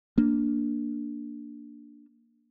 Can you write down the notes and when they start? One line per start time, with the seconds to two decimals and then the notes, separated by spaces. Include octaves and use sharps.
0.18 A#3 D4